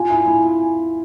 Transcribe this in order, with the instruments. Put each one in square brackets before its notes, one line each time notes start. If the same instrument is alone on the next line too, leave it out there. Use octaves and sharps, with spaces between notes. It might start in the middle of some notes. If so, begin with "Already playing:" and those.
Already playing: [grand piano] F4 [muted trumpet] G#5
[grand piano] E4
E4